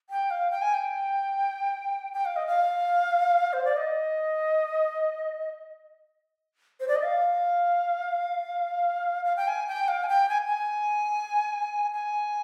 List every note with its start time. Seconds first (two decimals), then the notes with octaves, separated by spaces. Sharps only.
0.10 G5
0.31 F5
0.51 G5
0.62 G#5
0.74 G5
2.13 G5
2.25 F5
2.36 D#5
2.47 F5
3.53 C5
3.65 D5
3.77 D#5
6.80 C5
6.88 D5
6.96 D#5
7.03 F5
9.25 F5
9.37 G5
9.48 G#5
9.67 G5
9.88 F5
10.03 G#5
10.08 G5
10.29 G#5
10.47 G#5
11.92 G#5